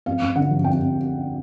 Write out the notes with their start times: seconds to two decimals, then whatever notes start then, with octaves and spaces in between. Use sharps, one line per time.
0.06 F2 F5
0.22 F2
0.36 D3 F#5
0.50 F3
0.64 F2 G5
0.79 F2